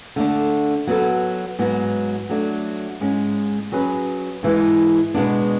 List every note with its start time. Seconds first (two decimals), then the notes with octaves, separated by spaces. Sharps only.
0.16 D3 A3 D4 A4
0.87 F#3 B3 F#4 A4
1.59 G#2 F#3 B3
2.29 F#3 A3 D4
3.01 G#2 G#3 C#4
3.72 F#3 C#4 G#4 B4
4.43 G#2 E3 G#3
5.14 B2 G#3 B3 D4